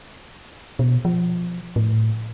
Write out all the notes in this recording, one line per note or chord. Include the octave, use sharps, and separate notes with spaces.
B2
F3
A2